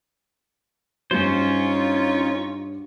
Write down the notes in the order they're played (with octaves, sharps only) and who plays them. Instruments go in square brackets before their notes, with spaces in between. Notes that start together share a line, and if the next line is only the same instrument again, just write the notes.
[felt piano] G2 F#3 G3 [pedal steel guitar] C#4 C5 [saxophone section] D#4 F4 C#5